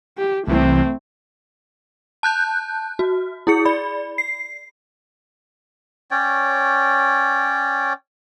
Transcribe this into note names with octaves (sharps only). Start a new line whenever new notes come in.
G4
C2 C3 E3 A3 C4
A5 F#6 G6
F#4
E4 G#4 C#7
D5 B5
C7
C#4 C#5 D5 G5